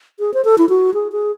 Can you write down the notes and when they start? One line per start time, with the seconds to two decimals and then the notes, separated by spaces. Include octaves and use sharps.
0.19 G#4
0.34 C5
0.45 A4
0.58 E4
0.69 F#4
0.94 G#4
1.12 G#4